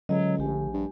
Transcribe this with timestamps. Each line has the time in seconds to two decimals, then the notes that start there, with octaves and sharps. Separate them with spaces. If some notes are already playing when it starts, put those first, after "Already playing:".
0.09 C#2 D3 F#3 D#5
0.39 A#1 A3 G4 G#5
0.73 G2